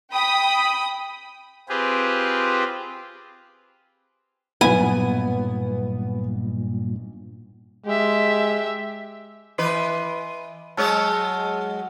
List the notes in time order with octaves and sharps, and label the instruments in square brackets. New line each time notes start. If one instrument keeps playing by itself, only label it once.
[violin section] G5 B5 D#6
[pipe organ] C4 F4 G4 G#4 B4
[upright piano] B1 B5 [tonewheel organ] G2 A#2 [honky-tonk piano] B3 [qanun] G#5
[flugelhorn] G#3 [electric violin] G4 E5
[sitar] E3 B4 [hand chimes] D#5 C6 C7
[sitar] F#3 G#3 C#5 [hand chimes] A5 E6 F6